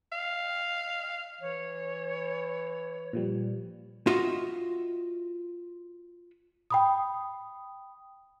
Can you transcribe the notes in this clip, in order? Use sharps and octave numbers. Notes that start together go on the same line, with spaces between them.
F5
E3 C#5
A#2 F3 G3
F4 F#4 D#5 E5
G5 B5 D#6